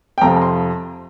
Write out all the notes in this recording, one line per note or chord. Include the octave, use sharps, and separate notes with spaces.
G5
F2 C3 F3 A#5
A#5
C6